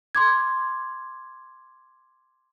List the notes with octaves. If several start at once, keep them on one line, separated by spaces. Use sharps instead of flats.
C6 D6 G#6